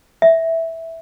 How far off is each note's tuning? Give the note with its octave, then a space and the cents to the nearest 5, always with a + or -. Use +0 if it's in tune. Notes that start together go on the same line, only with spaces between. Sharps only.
E5 -10